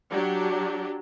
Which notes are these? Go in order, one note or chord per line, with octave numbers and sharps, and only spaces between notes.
F#3 D4 G4